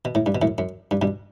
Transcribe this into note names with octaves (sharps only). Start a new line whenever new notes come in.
B2
A2
G2
B2
F#2 A2
F#2
G2
G2 B2